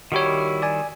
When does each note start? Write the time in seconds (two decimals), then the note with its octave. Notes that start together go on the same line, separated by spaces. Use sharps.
0.12 D#3 G3 E4 F#4 G4 C#5
0.62 D5 G#5